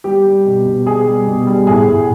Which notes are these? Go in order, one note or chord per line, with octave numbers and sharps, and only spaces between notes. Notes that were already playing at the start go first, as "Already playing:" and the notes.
G3 G4
G3
B2
B2
B2 G#4
G3
B2
G3
A2 G#4
A2